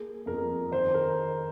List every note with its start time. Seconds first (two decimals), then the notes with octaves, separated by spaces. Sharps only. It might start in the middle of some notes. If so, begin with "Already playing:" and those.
Already playing: A#3 G#4
0.26 F2 A#4
0.71 D#3 C5
0.94 A#4